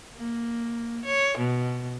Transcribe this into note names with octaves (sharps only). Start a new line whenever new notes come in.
A#3
C#5
B2